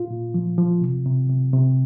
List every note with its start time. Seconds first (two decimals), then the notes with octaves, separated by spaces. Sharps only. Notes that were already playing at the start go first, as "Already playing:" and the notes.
Already playing: A#2 F4
0.10 A#2
0.34 F3
0.58 F3
0.81 C3
1.06 C3
1.29 C3
1.53 C3